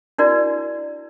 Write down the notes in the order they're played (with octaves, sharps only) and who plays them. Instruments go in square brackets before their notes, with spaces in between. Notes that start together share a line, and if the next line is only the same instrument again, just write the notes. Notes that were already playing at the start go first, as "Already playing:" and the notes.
[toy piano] D4 E4 F#4 A#4 D5